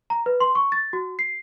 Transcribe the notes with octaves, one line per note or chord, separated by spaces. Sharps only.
A#5
B4
C6
C#6
A6
F#4
C7